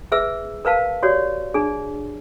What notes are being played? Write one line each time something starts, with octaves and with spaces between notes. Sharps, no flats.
G#4 B4 E5 E6
A#4 B4 F5 A5
F#4 G4 C#5 D5
D4 G#4